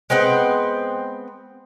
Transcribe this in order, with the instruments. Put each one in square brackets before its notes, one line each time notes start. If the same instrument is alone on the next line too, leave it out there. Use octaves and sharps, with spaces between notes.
[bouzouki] G#3 B3 C4 B4